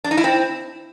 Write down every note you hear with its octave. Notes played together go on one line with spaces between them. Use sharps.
D4
D#4
E4
C4